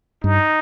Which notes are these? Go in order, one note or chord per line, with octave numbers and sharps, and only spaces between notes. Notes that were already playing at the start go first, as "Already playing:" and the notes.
G2 D#4